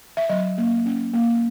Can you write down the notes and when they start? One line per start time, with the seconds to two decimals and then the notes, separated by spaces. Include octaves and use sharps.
0.17 E5
0.29 F#3 D#5
0.58 A#3
0.86 C#4
1.14 A#3